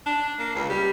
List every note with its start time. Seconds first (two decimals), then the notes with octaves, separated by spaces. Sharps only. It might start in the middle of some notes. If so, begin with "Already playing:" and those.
0.06 D4
0.39 A#3
0.56 C#2
0.70 G3